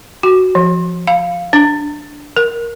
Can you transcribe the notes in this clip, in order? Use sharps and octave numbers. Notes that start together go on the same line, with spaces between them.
F#4
F3
F5
D4
A#4